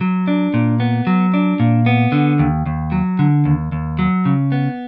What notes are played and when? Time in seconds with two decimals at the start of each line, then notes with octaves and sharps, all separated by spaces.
0.01 F#3
0.27 D4
0.54 A#2
0.80 B3
1.07 F#3
1.34 D4
1.60 A#2
1.86 B3
2.12 D3
2.39 D#2
2.66 D#2
2.92 F#3
3.19 D3
3.45 D#2
3.72 D#2
3.99 F#3
4.25 C#3
4.52 B3